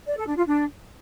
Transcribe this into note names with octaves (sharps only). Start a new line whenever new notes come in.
D5
A4
D4
F4
D4